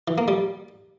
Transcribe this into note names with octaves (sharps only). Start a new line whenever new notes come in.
E3
A#3
G3